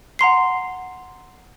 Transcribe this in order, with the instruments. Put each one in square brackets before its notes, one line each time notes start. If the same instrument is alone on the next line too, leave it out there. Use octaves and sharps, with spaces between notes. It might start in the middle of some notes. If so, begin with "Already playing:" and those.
[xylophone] F#5 A#5 C6 C7